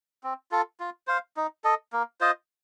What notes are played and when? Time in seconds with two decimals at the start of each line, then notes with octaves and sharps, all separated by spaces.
0.23 C4
0.51 F4 A4
0.80 F4
1.07 C5 F5
1.37 D#4
1.64 A4 D#5
1.93 A#3
2.21 F4 C5 D#5